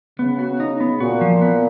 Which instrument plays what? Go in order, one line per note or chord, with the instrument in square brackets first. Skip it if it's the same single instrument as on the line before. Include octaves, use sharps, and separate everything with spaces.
[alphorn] C#3 [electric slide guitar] B3
[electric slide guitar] F#4
D#4
B3
[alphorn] A#2 [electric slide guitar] F#4
[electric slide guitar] F3
B3